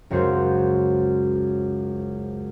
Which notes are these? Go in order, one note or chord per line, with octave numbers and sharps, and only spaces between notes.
C#2 F#2 F#4 C5